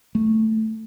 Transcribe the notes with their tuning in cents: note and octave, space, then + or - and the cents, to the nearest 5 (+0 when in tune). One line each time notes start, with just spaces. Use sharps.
A3 +5